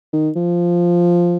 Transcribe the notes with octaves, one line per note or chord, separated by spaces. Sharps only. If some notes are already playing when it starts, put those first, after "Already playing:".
D#3
F3